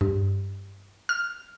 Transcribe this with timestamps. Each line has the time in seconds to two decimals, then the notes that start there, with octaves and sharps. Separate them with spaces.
0.01 G2
1.09 F6